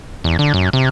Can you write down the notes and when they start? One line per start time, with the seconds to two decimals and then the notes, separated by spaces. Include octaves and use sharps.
0.24 E2
0.39 D3
0.54 F#2
0.73 C3